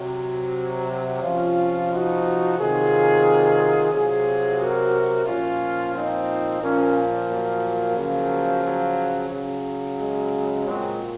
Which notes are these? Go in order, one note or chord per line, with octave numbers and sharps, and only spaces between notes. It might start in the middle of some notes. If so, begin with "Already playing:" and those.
Already playing: C3 F#3
C3 F3 C#4 F4
D#4 F#4
C3 D#3 F#3 F4 G#4
C3 F#3 F4 G#4
F#4 A#4
A#2 F3 C#4 F4
C4 D#4
A#2 F3 A#3 C#4
F#3 A#3
C#3 F3
F#3
C#3 F#3
G#3
A#2 F#3 G#3 C4